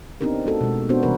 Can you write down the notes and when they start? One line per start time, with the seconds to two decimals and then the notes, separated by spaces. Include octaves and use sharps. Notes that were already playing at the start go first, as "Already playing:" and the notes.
0.21 B3 C4 D4 D#4 G4 A#4
0.46 A3 F#4 A4
0.61 B2 G#3
0.89 B3 C4 D4 F#4 C5
1.03 C3 E3 G3 A#3 A#4 B4